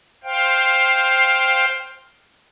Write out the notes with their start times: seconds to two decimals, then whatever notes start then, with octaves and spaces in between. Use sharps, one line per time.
0.24 C5 F5 G5